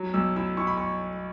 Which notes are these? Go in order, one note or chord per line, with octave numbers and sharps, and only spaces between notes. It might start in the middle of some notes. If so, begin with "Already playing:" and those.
Already playing: F#3
B1 E6
E4 E6
E4 C#6
B5
C#6